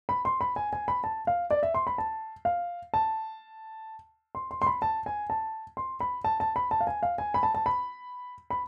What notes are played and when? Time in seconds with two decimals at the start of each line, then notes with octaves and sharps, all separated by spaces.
0.09 B5
0.25 C6
0.41 B5
0.56 G#5
0.73 G#5
0.88 B5
1.04 A5
1.27 F5
1.51 D5
1.63 E5
1.74 C6
1.87 B5
1.98 A5
2.45 F5
2.94 A5
4.35 C6
4.51 C6
4.62 C6
4.67 B5
4.82 A5
5.06 G#5
5.30 A5
5.77 C6
6.00 B5
6.25 A5
6.40 A5
6.56 B5
6.71 A5
6.81 F5
6.87 G#5
7.03 F5
7.18 G#5
7.34 B5
7.43 A5
7.55 A5
7.66 B5
8.50 B5